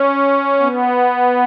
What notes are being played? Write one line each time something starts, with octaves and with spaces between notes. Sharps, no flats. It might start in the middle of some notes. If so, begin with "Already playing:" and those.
Already playing: C#4
B3